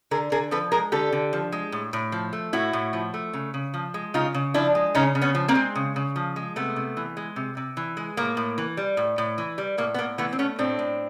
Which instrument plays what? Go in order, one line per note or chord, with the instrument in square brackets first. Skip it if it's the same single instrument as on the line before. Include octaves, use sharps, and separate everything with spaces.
[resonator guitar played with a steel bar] D3 G#4 A#4
D3 G#4 A#4
F3 A4 B4
G#3 G#4 A#4
D3 G4 A4
D3
F3
G#3
A2
A2
F3
A3
A2 E4 F#4
A2
F3
A3
C#3
C#3
F3
G#3
C#3 D#4 F4
C#3
F3 D4 E4
G#3
C#3 C#4 D#4
C#3
B3 C#4
F3
A#3 C4
G#3
C#3
C#3
F3
G#3
C3 A3 B3
C3
E3
G#3
C3
C3
E3
G#3
A2 A#3
A2
E3
G3
A2
A2
E3
G3
A2 A#3
B3
A2 A#3
E3 A3 B3
C4
A3 B3 C#4
A2 C4 D4
A2